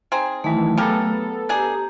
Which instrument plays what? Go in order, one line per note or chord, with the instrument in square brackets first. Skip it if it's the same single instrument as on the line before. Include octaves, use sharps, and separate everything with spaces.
[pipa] C4 D#4 G#4
[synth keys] D#3 E3 [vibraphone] F#3 A3
[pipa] C#3 G4 A#4 [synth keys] B3 A4
[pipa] D4 G#4 [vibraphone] G4 A#5